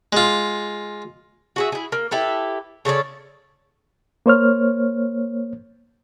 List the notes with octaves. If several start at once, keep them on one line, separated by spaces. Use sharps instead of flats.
G#3 F4
F#4 G#4 E5
E4 G#4
A#3
E4 G4 A4 B4
C#3 A4 C#5 D5
A#3 C5 C#5 F6